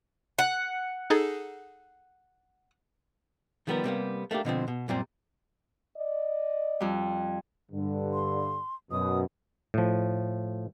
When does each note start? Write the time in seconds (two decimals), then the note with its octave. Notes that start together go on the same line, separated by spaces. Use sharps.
0.39 F#5
1.10 D#4 G#4 A4
3.67 D#3 F3 G3 B3 A4 A#4
3.84 C3 G3 A#3 B3
4.31 A3 A#3 D4 G4
4.45 B2 D3 F3 C4
4.68 B2
4.88 F#2 A#2 G3 C4
5.96 D5 D#5
6.80 F2 G3
7.72 G2 D3
8.13 C6
8.91 F#2 B2 D#6
9.74 A2 F3